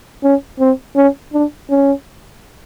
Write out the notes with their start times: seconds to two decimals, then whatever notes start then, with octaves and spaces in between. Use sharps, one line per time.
0.24 C#4
0.60 C4
0.96 C#4
1.34 D4
1.70 C#4